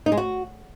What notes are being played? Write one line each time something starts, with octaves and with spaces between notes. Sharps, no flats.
D#4
G#3
F#4